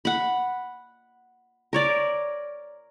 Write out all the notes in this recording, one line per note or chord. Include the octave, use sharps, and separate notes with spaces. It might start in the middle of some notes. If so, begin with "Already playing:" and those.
F#5 B5
A#4 C#5 D5